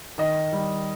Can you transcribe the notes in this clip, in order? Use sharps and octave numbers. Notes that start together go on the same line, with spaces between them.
D#3 D#5
G3